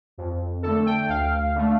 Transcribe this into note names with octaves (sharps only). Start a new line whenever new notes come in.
F2
D3 A3 A4
G5
D2 F5
D3 A3